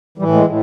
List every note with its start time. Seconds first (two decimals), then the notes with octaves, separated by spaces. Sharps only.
0.18 E3 G3
0.22 A2
0.32 G#3
0.46 A2